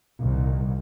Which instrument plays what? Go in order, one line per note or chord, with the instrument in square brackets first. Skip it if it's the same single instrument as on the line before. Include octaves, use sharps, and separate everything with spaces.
[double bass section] C2 A#2 D#3